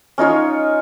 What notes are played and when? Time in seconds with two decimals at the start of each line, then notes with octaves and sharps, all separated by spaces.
0.18 C#4 D#4 F4 C#5